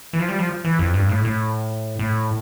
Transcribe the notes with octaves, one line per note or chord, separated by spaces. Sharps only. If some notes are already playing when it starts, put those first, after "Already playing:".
E3
F3
G3
F3
E3
F2
G2
A2
A2
A2